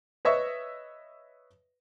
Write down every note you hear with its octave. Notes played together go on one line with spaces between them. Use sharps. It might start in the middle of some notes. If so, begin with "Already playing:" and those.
B4 C#5 D#5 E5 C#6